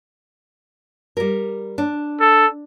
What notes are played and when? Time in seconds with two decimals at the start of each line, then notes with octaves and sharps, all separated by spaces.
1.17 G3 A#4
1.78 D4
2.20 A4